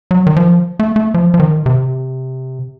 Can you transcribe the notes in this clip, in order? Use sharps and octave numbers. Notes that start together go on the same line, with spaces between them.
F#3
D#3
F3
A3
A3
F3
F3
D#3
C3